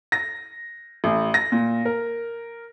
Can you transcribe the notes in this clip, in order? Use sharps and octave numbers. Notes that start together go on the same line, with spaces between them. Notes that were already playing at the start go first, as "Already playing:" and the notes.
A#6
A1
A#6
A#2
A#4